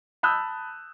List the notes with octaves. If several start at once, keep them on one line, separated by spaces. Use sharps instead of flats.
A5 B5 D#6 E6 F#6 G6